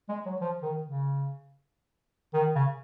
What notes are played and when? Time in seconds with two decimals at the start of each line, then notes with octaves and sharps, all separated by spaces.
0.09 G#3
0.26 F#3
0.41 F3
0.62 D#3
0.83 C#3
2.34 D#3
2.55 C#3